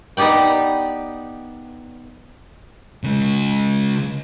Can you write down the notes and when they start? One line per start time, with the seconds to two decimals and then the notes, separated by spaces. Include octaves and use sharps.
0.17 B3 D#4 G4 D5 G5
3.04 C#3 G#3